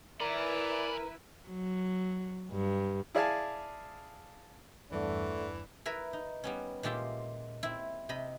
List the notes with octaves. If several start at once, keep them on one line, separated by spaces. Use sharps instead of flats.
E4 A#4 B4 D5 G#5 B5
F#3
G2
E4 G#4 D5 F5 G#5 A5
E2 G2 D3 E3 A3 D5
E4 A#4 B4 E5
D#4
G3 B3 C#4
A#2 G#3 F4 G4 E5 G5
C4 E4
C3 D#5 B5